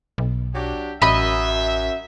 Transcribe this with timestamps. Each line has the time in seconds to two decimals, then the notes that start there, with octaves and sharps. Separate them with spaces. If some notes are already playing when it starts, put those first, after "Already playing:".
0.18 B1
0.55 F#3 D4 G4
1.02 A1 F#2 D#5 E5 B5